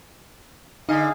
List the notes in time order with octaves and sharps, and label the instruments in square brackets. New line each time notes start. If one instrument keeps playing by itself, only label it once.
[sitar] D3 D#5 [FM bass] D#4 [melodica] G#4 F5